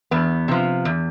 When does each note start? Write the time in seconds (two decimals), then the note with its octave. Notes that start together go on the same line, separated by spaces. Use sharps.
0.11 E2 B3
0.48 C3 F3
0.85 E2